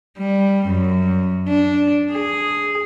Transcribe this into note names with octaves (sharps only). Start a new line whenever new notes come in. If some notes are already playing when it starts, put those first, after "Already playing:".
G3
F#2
D4
G#4